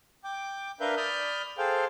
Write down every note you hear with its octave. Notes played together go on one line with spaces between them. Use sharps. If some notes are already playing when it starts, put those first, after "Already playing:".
G5 D6
D4 A#4 B4 E5 F5 G6
D5 B5 D#6 F6 G6
G#4 A4 C5 F5 G5